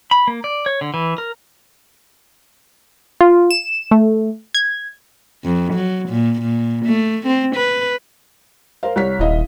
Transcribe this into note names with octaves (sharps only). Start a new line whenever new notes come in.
B5
A#3
D5
C#5
D3
E3
A#4
F4
E7
A3
G#6
F2
F#3
A#2
A#2
A3
C4
B4
A#4 C5 F5
C2 C#5 B6
D#1 E4 D#5 F5